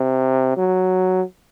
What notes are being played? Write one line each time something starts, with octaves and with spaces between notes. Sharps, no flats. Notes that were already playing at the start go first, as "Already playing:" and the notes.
Already playing: C3
F#3